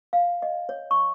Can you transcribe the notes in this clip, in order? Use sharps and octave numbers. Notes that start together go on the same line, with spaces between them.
F5
D#5
C#5
C#6